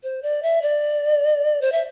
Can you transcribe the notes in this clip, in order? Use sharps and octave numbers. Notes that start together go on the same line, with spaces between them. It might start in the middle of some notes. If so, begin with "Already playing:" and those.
C5
D5
E5
D5
C5
E5